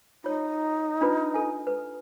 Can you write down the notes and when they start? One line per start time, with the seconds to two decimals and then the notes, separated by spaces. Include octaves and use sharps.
0.24 D#4 F4 C#5
1.01 D4 F4 B4
1.34 A4 G#5
1.67 B4